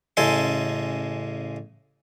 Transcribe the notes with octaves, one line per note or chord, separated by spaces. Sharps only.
A1 C#3 G#3 A4 G#5 C6